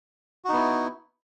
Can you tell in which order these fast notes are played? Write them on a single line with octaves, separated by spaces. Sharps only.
F#4 D#4 B3 E4